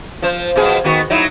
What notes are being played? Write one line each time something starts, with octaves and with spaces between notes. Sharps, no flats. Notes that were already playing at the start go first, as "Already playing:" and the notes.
F3 C5
B2 F3 G#4
D#3 B3 F#4
F#3 D#4 E4